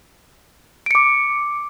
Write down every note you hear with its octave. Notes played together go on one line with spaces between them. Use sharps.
D6 C#7 D7